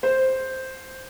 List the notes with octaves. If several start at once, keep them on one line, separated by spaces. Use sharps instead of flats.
C5